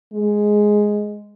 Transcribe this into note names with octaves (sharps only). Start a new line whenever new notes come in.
G#3